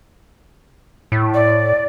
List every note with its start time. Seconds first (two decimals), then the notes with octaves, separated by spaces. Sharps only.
1.12 A2
1.34 D5